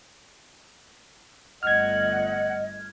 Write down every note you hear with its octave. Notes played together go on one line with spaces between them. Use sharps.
G1 A3 D#5 F#5 F6 G#6